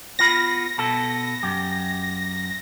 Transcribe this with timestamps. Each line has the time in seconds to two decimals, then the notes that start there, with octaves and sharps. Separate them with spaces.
0.19 B3 F4 B5 A#6
0.78 B2 B3 A4
1.43 F#2 G4